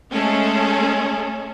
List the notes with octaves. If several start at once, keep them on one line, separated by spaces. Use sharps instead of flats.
G#3 A3 C#4 G#4 A4